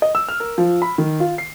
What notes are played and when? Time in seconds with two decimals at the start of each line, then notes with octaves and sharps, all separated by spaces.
0.02 D#5
0.15 E6
0.29 F6
0.40 A#4
0.58 F3
0.82 B5
0.98 D#3
1.20 F4
1.38 C7